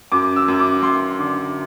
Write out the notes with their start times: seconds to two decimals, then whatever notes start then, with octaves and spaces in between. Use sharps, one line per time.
0.12 F#2 D6
0.36 E6
0.48 F#2
0.59 D6
0.82 F#2 C6
1.19 D3 D6